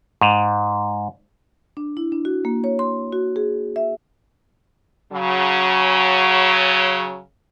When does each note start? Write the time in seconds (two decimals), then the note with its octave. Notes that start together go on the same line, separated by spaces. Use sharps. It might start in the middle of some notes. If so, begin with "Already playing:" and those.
0.21 G#2
1.77 D4
1.97 E4
2.12 D4
2.25 F#4
2.45 A#3
2.64 C#5
2.79 C6
3.13 F#4
3.36 G#4
3.76 E5
5.12 C#3 F#3